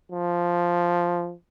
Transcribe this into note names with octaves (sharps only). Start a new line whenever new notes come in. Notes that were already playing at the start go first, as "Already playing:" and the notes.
F3